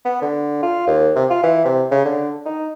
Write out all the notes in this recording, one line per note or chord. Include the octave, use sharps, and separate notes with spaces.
B3
D3
F4
D#2
C3
F4
E3
C3
C#3
D3
D#4